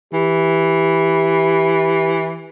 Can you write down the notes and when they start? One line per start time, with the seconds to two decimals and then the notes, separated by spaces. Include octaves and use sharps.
0.14 E3 G4